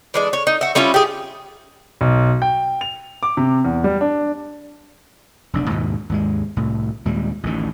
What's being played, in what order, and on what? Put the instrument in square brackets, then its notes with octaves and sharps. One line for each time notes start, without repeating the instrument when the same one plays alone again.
[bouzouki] E3 G#3 D4
C#5
D#4
F#4 E5
G3 C#4 E4 F4
G4 G#4
[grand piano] B1
G5
F7
D6
C3
E2
G3
D4
[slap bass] F1 B1 D4
D#2 G#2 B2
D#2 G#2 G#3
C2 A2
D#2 A#2 G3 G#3
A1 D2 D#3